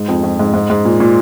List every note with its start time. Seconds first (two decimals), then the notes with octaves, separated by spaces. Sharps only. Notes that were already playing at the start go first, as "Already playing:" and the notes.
Already playing: G#2
0.08 F2
0.23 F2
0.39 G#2
0.54 G#2
0.70 G#2
0.85 A#2
1.00 A#2